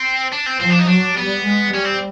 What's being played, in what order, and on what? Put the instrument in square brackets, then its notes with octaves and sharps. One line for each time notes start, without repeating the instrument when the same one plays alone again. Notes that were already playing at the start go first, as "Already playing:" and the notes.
Already playing: [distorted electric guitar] C4
D4
C4
[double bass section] F3 [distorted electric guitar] C4
[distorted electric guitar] D4
D#4
[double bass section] F#3 [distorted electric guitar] D4
[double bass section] G3 [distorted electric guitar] B3
[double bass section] G#3
[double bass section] G3 [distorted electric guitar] C#4
[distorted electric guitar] C4